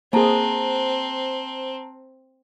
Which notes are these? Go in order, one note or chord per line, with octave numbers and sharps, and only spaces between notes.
A#3 C4 G#4 C5 A5 A#5